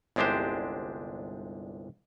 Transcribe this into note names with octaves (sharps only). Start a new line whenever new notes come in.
G1 C2 G#3 D4 G4 C5